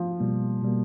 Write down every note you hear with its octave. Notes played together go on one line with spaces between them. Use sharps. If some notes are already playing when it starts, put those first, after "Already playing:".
Already playing: F3
B2 G3 A#3
B2 G3 A#3